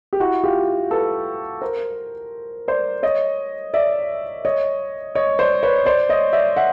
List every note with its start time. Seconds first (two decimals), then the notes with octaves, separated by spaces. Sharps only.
0.13 G4
0.20 E4 F#4
0.43 F4 G4
0.90 A4 B4
1.62 A#4 C5
2.68 C5 D5
3.03 C#5 D#5
3.74 D5 E5
4.45 C#5 D#5
5.15 C#5 D#5
5.39 C5 D5
5.63 B4 C#5
5.86 C5 D5
6.09 C#5 D#5
6.33 D5 E5
6.56 E5 F#5